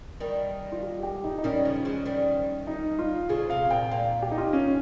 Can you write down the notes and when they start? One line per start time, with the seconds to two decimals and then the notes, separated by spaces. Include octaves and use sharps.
0.20 D#3 G3 A#4
0.72 F4
0.83 G4
1.03 G4
1.24 D#4
1.38 D#4
1.44 D#3 G3 C#4
1.65 C#3 F3
1.85 F3 G#3
2.05 D#3 G3
2.67 D#4
2.99 F4
3.29 C#3 F3 G#4
3.50 C3 F5
3.70 A#2 G5
3.91 A#2 F5
4.22 G4
4.31 D#4
4.38 F4
4.53 C#4